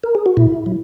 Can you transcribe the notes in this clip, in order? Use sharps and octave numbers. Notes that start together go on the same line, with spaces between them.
A#4
G#4
F#4
A#2 E4
F#3